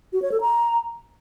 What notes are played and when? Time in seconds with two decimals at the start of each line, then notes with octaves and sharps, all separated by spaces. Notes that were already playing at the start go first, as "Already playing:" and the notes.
0.13 F#4
0.22 C#5
0.32 A4
0.41 A#5